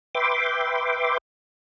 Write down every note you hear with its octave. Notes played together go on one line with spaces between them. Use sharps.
B4 E5 G5 C6 D6